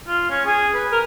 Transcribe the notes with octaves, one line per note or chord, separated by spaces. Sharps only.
F4
C#4
G#4
B4
A#4